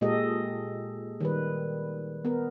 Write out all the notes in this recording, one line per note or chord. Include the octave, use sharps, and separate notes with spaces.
A#2 G#3 G4 A4 D#5
D#3 G3 B4
B3 A#4